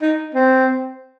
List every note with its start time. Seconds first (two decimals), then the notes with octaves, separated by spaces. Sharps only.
0.02 D#4
0.35 C4